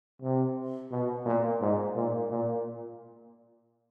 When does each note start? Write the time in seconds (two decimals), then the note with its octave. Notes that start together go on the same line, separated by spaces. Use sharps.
0.22 C3
0.91 B2
1.25 A#2
1.61 G#2
1.96 A#2
2.31 A#2